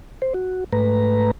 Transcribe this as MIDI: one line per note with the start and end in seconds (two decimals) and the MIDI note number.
0.22 0.33 72
0.34 0.64 66
0.73 1.31 44
0.73 1.31 57
0.73 1.31 71
0.73 1.31 82